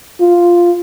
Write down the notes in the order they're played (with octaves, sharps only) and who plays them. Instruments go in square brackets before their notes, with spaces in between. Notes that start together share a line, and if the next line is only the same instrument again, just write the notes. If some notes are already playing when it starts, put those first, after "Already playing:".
[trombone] F4